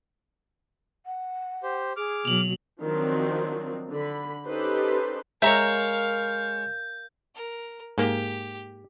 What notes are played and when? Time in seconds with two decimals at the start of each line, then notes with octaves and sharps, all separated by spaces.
1.06 F#5
1.63 G4 C5
1.97 G#4 D6 F6
2.25 B2 F#3 F7 F#7
2.81 D#3 F3 F#3 C4 D4
3.89 D3 B5
4.47 C#4 D#4 G4 A4 B4 C5
5.42 G#3 A#4 C#5 E5 F5 A#5 G6
7.35 A#4
7.98 G#2 A#3 G4